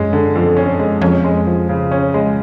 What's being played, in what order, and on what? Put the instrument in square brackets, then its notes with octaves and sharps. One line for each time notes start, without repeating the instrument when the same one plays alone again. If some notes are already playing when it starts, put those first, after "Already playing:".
Already playing: [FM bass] F#2 [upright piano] G#3 C#4
[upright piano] D3
F2
C#4
G#3
[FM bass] F2 [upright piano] C#4
[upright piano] G#3
F3
C#3
C#4
G#3